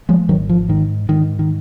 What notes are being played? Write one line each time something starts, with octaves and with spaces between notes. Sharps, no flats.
F3 G#3
G#1 D#3 F#3
F3
G#2 D#3
G#2 D#3
D#3